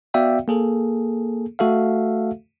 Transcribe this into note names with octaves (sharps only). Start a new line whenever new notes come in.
B3 F#4 D5 E5 F5 G5
A#3 G#4 A4
A3 F#4 A4 E5 F5